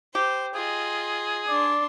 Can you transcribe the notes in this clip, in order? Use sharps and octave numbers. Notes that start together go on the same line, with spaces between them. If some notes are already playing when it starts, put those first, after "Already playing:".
G4 C5
F4 G#4 D#5
D4 D5 C6